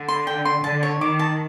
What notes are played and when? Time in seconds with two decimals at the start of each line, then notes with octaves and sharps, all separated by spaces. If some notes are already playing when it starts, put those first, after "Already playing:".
Already playing: D3
0.08 C6
0.27 G5
0.45 C6
0.63 D3 A5
0.83 C#5
1.01 D#3 D6
1.19 A5